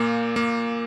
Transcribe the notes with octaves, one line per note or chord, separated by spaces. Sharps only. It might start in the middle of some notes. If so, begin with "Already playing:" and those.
Already playing: A#2 A#3
A#3